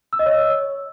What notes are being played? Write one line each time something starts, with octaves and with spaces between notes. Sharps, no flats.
E6
D#5
C#5